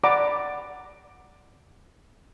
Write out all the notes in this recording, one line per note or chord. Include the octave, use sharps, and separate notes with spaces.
D5 F#5 A#5 B5 D6